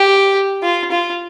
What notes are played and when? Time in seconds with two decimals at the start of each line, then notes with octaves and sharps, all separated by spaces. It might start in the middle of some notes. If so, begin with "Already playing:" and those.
Already playing: G4
0.63 F4
0.92 F4